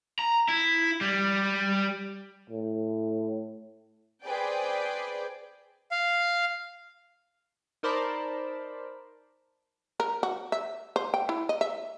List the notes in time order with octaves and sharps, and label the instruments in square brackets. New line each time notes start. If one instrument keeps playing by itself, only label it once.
[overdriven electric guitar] A#5
E4
G3
[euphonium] A2
[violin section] G#4 B4 C5 D5 G5
[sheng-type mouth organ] F5
[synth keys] D#4 A#4 C5 D5 A5 B5
[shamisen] A#4
F#4
E5
C5
G5
E4
D#5
E5